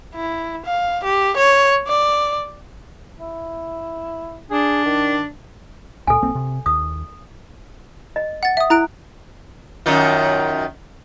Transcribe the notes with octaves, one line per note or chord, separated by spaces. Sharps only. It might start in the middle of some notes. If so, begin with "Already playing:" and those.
E4
F5
G4
C#5
D5
E4
D4 G#4
D#3
C#2 A#2 A4 G#5
B1 A#3 C4
C3
D#2 D#6
D#5
F#5 A6
E5 D#6
E4 A#5 F#6 D7
F#2 D#3 F4